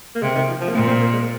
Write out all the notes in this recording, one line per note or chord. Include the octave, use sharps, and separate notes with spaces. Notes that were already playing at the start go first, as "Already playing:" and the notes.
A#3
C3 G#3
D#3
F3
F3
A#3
A#2 C4
C4
A#3
G#3